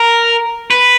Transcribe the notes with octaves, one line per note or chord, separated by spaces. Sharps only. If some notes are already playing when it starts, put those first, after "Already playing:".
Already playing: A#4
B4